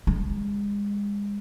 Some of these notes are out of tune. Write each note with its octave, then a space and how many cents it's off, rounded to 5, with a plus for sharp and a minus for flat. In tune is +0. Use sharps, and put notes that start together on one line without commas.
G#3 -35